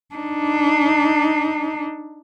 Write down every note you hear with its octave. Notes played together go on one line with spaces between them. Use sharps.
D4 D#4